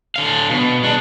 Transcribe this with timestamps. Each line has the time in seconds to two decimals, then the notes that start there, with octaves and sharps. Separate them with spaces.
0.16 D3 F5
0.50 B2
0.83 G#3 D4